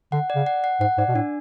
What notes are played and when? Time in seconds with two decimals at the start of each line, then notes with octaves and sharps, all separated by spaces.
0.12 D3 F#5
0.30 D5
0.35 C#3
0.46 F#5
0.64 F#5
0.81 G#2 F#5
0.98 G#2 D5
1.08 B2
1.15 A2 D4